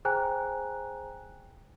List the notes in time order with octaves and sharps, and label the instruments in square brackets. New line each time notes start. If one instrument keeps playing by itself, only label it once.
[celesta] G#4 C5 G5 G#5 A#5 F#6